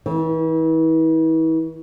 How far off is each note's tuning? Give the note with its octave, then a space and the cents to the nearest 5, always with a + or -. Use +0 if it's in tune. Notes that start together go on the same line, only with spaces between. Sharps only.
E3 -40